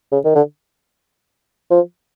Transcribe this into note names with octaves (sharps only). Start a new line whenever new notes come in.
C#3
D#3
D3
F3